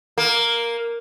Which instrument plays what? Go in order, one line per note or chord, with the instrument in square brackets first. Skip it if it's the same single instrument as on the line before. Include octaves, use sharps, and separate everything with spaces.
[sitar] A#3